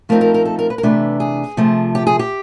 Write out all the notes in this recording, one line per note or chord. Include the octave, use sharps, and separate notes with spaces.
F3 A3 C4 D#4 A#4
A#4
A#4
A4
A#4
B4
A#4
C3 E3 A3 D4 B4
G#4
C3 F3 A3
G4
G#4
G4